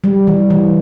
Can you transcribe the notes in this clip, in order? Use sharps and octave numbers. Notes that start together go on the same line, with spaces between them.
G3
E3
E3